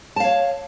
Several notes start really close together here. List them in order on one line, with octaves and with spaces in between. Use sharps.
A5 F5 C#5